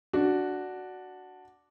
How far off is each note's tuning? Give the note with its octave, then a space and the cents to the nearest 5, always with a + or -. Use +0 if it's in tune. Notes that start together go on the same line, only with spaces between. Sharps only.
D4 +0 F#4 +0